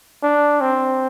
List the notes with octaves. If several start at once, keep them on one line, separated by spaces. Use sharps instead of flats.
D4
C4